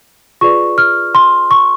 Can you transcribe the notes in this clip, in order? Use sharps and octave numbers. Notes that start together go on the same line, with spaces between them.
F4 G#4 B4 D5 C#6
F6
C6
C#6